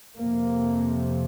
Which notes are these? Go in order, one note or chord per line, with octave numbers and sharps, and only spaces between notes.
F2 C3 A#3